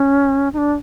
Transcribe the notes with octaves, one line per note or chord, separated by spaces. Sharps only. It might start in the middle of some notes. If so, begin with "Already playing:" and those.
Already playing: C#4
D#4
D4